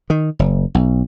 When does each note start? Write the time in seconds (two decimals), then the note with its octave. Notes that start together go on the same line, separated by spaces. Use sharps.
0.10 D#3
0.39 F#1
0.75 B1